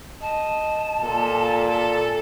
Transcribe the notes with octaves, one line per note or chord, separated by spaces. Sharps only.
D#5 A5
A#2 A4
A4